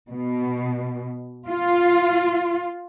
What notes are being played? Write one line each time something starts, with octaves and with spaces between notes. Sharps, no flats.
B2
F4